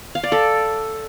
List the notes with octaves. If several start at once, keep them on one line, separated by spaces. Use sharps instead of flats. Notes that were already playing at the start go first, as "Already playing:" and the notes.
F5
D5
A4